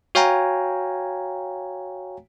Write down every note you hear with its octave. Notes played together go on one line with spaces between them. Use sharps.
F#4 C#5 F5 G5 G#5 A#5